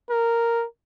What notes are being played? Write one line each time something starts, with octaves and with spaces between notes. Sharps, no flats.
A#4